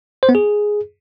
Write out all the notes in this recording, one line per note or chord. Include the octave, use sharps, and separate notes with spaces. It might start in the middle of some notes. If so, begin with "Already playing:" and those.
C5
B3
G#4